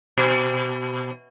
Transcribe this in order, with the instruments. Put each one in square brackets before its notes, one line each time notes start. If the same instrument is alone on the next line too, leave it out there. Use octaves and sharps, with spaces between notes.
[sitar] B2